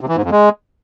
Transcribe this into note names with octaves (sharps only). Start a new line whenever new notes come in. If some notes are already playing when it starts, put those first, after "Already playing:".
C3
E3
G#2
F2
G#3